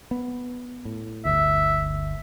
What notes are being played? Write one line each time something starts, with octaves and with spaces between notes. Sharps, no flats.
B3
A2
G1 D2 E5